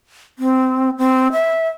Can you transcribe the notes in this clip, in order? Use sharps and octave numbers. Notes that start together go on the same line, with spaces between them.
C4
C4
E5